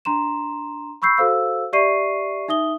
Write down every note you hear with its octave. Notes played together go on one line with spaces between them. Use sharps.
D4 A#5 C6 E7
B5 C#6 E6 G6 C7
F#4 A4 C5 F5 E6
G4 D5 E5 C#6 C7 D#7
D#4 E5 D#6 G7